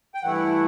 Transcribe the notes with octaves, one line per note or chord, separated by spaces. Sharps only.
G5
G2 E3 A3 E4 F#5